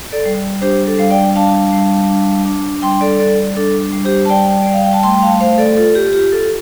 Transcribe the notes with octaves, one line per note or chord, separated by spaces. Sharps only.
A4 D5
G3
D4 G4 C5
A4
G3 F5
D5 G5
D4 F5 A5
G3
D4
D4
G3 G5 C6
A4 D5
G3 A4 D5
D4 A4
G3
G4 C5
A5
G3 D5 G5
G3 D5
F5
G5
A5
A3 G5 C6
G5
F5 A5
A3 C5 F5
A4 D5
F4 A4
G4
F4 G4
A4